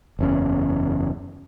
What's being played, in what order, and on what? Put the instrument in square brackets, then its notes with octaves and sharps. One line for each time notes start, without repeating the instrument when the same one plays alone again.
[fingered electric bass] F#1 E2 C#4